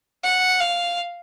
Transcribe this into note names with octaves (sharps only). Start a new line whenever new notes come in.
F#5
F5